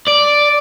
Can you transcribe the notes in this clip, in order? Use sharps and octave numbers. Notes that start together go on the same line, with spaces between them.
D5